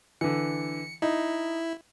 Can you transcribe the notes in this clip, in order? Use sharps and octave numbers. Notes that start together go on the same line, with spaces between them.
D3 E3 C#7
D#4 E4